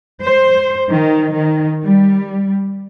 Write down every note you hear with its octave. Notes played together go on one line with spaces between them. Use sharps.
C5
D#3
D#3
G3